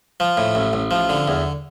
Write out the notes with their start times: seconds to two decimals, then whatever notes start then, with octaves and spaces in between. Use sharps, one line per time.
0.20 F3
0.37 A2
0.55 A1
0.73 A1
0.91 F3
1.09 D3
1.28 E2